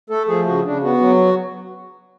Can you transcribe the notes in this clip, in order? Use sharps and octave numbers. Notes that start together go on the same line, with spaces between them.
A3 A4
F3 G#4
C#3 F#4
C#3 D4
B3 F#4
F#3